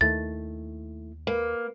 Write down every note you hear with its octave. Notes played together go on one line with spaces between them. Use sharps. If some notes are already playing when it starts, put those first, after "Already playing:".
D#2 D#3 A3 E4 A6
A#3 B4